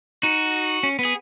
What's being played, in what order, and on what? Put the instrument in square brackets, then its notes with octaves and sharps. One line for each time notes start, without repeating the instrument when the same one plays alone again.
[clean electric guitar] D#4 [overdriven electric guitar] F#4
[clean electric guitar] C#4
B3
[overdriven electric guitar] G#4